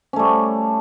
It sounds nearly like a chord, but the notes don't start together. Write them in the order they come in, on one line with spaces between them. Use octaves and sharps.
C#4 A3 G3